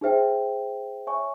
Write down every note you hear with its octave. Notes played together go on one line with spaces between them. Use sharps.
D#4 G#4 C5 E5 G5
C#5 E5 G#5 C#6